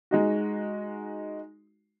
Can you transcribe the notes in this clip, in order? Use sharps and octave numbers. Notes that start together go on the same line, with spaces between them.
G#3 D#4 F#4